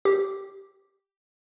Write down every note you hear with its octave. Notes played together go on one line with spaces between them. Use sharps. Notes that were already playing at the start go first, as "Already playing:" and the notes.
G4